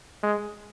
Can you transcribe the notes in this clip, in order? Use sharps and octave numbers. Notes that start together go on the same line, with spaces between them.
G#3